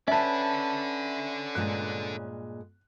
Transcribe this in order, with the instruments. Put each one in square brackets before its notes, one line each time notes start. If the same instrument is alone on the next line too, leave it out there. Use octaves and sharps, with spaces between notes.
[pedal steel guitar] C#4 B4 [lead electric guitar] A4 D5 [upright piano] E5 A5
[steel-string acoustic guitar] G2 A#2 G#3 [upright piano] F#6